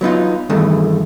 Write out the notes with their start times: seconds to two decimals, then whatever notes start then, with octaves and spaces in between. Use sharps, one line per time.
0.01 F#3 B3 D#4 F4
0.50 E2 G2 D#3 A3